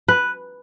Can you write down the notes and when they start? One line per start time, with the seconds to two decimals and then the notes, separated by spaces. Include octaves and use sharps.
0.08 B4